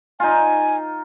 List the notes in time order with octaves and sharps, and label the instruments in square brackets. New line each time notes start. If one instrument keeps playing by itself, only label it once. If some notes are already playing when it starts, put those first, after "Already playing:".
[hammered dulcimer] D#4 F4 [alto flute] G#5